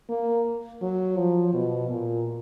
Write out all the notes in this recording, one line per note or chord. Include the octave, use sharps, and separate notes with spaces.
A#3
F#3
F3
B2
A#2